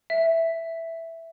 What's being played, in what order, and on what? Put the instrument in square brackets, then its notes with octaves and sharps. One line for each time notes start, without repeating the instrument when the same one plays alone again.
[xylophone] E5